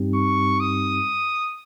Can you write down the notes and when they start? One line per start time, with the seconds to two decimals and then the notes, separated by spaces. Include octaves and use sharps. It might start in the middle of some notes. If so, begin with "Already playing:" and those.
Already playing: G2 G3 C4 D#4 G4
0.15 C#6
0.60 D#6